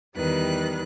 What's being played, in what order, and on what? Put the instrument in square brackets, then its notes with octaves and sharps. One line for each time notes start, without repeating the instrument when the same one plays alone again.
[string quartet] E2 D#3 G3 B4 F#6